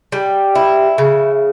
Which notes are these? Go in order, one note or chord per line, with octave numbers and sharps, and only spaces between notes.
G3
E4
C#3